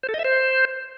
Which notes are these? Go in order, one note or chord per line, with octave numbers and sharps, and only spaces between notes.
C5
A4
D#5
E5
C5